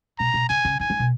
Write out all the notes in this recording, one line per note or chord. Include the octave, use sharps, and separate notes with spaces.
B2 A#5
B2
C#3 G#5
C#3
D#3 G#5
D#3
B2